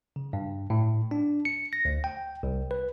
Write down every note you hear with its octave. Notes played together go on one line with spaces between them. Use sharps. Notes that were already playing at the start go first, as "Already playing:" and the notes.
C#3
G2
A2
D4
C#7
A#6
D2
G5
C2
B4